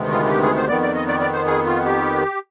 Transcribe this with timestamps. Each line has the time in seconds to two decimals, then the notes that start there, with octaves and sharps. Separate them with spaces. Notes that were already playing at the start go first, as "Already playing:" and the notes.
Already playing: D2 C3 D#3 G#3 B3
0.11 F4
0.25 F4
0.29 G4
0.43 G#4
0.56 C5
0.68 F2 D#3 B3 D5
0.82 D5
0.95 D#5
1.08 D5
1.20 D5
1.33 C5
1.46 G#4
1.66 F4
1.85 G4